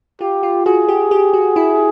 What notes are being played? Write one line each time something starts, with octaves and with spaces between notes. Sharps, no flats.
F4 G4
F4
F#4 G#4
G4
G4
F#4
E4